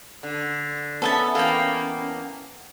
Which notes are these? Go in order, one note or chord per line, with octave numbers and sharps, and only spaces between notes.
D3
B3 C#4 A4 E5 A5
E3 A#3 A4 F5 G5